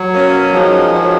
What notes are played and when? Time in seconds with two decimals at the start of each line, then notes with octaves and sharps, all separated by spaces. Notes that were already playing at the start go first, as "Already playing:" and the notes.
Already playing: F#3
0.14 B2 A#3 C#4
0.53 D#3 F3 G#3 C#4 F#4
0.93 D#3 G#3 C#4 F#4